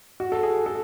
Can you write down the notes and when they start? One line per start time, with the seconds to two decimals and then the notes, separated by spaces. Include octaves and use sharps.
0.20 F#4
0.32 A4
0.43 G#4
0.66 A4